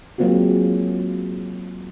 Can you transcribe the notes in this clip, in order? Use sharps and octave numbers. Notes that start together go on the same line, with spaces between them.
F#3 G#3 A#3 C4 F4 F#4